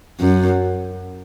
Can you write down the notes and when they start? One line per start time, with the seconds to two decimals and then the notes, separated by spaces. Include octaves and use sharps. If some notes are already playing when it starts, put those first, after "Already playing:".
0.20 F#2